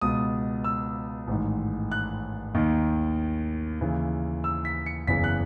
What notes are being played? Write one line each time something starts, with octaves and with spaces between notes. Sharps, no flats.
C#2 B2 D#6
E6
A1 G#2 D#3
F#6
D#2 D#3
D#2 C#3 E3
E6
B6
C#7
F#1 E2 C#3 E3 B6
F#6